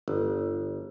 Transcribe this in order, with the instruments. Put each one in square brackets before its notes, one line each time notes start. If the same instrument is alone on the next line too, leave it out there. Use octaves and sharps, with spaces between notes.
[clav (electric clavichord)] G1